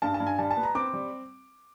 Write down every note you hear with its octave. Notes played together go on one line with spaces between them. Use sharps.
G2 A5
A5
G2
G#5
G3 A5
A5
B3
A#5
C4 D6
G3